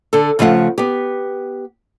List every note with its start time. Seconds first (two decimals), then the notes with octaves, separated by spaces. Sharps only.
0.13 D3 A4
0.39 C#3 F3 A3 F5 F#5
0.78 B3 G4